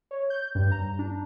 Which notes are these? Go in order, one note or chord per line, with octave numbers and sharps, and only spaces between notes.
C#5
G6
G2
A#5
D4